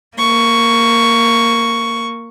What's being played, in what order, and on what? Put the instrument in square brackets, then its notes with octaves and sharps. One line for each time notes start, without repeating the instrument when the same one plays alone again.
[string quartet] A#3 C#6